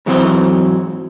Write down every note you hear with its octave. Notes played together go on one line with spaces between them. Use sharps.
G#2 E3 F#3 A#3 C4 C5